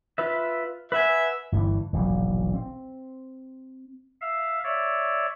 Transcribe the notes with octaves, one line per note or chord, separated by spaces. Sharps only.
F4 B4 E5
B4 E5 F#5 G#5
G1 G2 C#3 E3
E1 A#1 G#2 F#3
C4
E5 F5
C#5 D5 E5